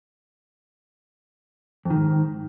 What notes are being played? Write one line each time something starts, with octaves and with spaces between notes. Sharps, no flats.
F2 G#2 D#3